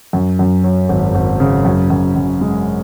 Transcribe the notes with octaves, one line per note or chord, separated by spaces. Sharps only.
F#2
F#2
F#3
G#1
G#1
C#3
F#2
F#2
F#2
G#3